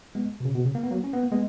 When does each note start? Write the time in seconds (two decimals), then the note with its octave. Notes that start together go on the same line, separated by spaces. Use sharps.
0.15 G#3 B3
0.40 B2
0.45 C#3
0.55 B2
0.65 C#3
0.75 A#3
0.83 B3
0.91 F#3 A#3
1.04 C#4
1.13 B3
1.23 A#3
1.32 G#3 B3